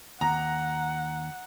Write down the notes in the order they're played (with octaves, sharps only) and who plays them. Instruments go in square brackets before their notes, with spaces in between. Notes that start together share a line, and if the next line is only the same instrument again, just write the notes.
[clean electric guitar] D#2 [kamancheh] F#5 [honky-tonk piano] A#5